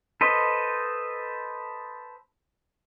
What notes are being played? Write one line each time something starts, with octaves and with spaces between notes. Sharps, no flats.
A4 B4 C5 D#5